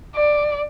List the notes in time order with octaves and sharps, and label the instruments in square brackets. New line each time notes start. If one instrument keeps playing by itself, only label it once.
[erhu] D5